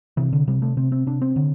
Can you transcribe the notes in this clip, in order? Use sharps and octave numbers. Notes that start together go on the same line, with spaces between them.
C3 E3
D3
C3 G3
A3
C3 C4
C4
C3 D4
C4
D3